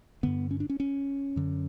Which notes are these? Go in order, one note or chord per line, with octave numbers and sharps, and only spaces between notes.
G2 D3 B3
C#4
D4
C#4
C#4
F#2 D3